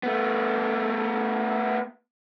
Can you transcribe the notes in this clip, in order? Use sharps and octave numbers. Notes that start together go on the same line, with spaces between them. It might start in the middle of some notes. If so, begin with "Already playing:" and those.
A3 B3